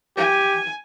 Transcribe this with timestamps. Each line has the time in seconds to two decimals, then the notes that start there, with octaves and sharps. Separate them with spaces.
0.17 G4 G#5